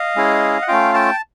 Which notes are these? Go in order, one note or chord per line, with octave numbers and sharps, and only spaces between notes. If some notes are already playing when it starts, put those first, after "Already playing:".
Already playing: D#5 F5
G#3 C#4 E4 G#4
F#5
A3 C#4 F4 F5 G5
G5 A5